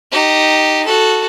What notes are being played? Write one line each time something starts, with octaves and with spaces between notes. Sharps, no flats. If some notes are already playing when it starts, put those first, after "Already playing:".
D#4 G4
F#4 A4